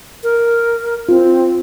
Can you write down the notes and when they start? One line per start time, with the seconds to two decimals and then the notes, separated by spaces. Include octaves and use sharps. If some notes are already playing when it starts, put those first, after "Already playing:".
0.23 A#4
1.09 C4 F4